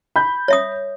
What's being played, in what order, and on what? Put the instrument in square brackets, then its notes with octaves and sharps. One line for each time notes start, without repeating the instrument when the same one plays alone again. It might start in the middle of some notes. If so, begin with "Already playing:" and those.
[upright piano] B5 G6
[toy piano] C#5 E5 D#6